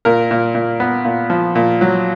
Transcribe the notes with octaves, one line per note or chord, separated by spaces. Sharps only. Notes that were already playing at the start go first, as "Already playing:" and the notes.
A#2 A#4
A#2
A#2
B3
A#2
F3
A#2
F#3